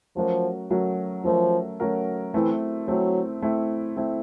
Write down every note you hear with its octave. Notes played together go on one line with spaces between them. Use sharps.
F3 F#3 A3 C#4 F#4 A#4
F#3 A3 C#4 F#4 A#4
F3 F#3 A3 C#4 F#4 A#4
F#3 A3 C#4 F#4 A#4
E3 A3 C4 E4
F#3 A3 C4 E4
A3 C4 E4
A3 C4 E4